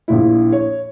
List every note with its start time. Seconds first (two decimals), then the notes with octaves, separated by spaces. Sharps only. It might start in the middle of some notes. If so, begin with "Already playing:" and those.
0.08 A#1 A#2 E4
0.52 C#5